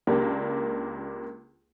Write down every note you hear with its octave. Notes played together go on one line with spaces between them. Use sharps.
C#2 A#3 D4 G4